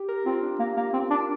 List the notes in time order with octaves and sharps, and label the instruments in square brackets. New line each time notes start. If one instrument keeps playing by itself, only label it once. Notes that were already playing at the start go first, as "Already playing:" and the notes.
Already playing: [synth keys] G4
A#4
[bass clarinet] C4 [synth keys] F4
[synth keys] D4
[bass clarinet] A#3
A#3
C4
D4